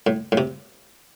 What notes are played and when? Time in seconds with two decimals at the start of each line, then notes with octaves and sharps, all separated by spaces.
0.07 A2
0.32 A2
0.37 C3